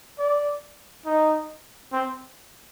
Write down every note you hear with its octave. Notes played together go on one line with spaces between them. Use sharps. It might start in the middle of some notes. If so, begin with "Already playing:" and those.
D5
D#4
C4